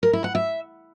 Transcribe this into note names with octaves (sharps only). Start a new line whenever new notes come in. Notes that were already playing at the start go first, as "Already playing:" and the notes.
A#4
E4
F#5
E5